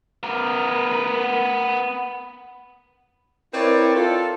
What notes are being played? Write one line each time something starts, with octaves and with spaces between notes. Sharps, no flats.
B3 A#4
C4 E4 A#4 B4 C#5 D5
F4 A4